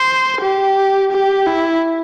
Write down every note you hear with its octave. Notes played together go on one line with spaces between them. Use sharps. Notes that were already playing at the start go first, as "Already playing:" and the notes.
Already playing: C5
G4
G4
E4